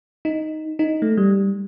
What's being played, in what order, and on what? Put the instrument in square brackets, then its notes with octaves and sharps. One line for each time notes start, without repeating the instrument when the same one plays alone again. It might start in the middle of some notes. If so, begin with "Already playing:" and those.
[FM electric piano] D#4
D#4
A3
G3